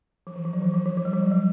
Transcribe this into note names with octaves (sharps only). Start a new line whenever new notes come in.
F3
E3
F3
F#3
E3
F3
F3
F3
G3
F3
F#3
G3